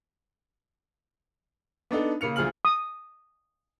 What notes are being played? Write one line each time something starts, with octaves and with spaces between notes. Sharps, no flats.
B3 D4 D#4 A4
C#3 A#3 C#7 F7
D2 F3 G#4 F6 F#7
D#6